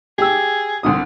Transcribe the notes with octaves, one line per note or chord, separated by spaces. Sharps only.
G4 G#4 E6
C2 D3 D#6